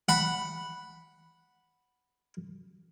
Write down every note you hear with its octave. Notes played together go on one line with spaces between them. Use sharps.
F#5 B5